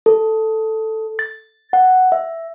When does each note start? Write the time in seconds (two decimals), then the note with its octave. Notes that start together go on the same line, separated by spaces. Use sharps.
0.06 A4
1.19 A6
1.73 F#5
2.12 E5